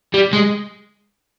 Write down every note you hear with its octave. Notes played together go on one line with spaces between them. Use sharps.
G3
G#3